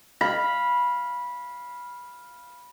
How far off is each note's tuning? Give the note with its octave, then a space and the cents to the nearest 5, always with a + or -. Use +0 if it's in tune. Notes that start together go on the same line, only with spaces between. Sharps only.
F5 +0 B5 -15